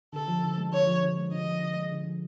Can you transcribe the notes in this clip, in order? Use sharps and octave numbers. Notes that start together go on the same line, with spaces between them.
D3 A4
F3
D3
G#3
D3 C#5
F3
D3
G#3
D3 D#5
F3
D3
G#3
D3
F3